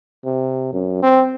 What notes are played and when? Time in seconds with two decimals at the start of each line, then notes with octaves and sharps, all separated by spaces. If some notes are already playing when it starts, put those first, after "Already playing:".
0.25 C3
0.73 F#2
1.02 C4